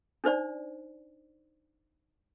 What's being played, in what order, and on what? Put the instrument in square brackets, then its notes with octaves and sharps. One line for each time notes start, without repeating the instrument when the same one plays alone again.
[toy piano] D4 D#4 C5 D5